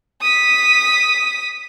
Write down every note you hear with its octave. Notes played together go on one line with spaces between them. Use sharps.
D#6 B6